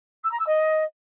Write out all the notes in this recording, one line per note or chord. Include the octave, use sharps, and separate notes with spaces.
E6
A#5
E6
D#5